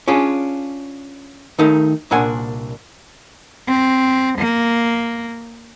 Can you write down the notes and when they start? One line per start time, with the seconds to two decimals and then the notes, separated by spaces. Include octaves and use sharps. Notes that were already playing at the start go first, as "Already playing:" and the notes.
0.08 C#4 D4 F4 G#4
1.59 D#3 A3 D#4 A#4
2.11 C2 A#2 D4 A#4 F#5 G#5
3.68 C4
4.39 A#3